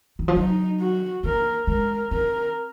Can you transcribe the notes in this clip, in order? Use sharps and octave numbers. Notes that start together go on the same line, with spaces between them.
D#3
F3
F#3 D#4
F#4
A#3 A#4
G#3 A#4
C4 A#4